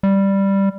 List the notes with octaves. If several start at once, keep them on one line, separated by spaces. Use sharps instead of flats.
G3